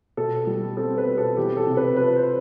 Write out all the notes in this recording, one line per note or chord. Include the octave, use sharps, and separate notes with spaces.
B2 A4
G3
C4 A4
B4
B2
A4
E2 G4
A4
C3
B4
F3 B4
C5